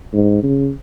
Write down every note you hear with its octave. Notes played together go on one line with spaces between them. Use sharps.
G#2
C#3